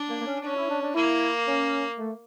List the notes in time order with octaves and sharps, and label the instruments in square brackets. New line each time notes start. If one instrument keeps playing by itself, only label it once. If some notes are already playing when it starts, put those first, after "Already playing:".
Already playing: [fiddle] D4
[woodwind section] A#3
A#3
C#4
[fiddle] C#4 [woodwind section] D4
[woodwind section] E4
D4
D4
[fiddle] A#3 [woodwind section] E4
[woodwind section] C#4
A3